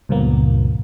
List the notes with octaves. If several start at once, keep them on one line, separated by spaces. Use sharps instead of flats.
C#2 G2 A#2 F3 A#3 B3